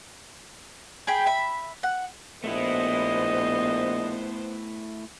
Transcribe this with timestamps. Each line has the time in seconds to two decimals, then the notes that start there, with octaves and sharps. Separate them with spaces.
1.07 G#4 G5 B5
1.26 E5 B5
1.83 F#5
2.44 A#1 A3 B3 E4 C5 D#5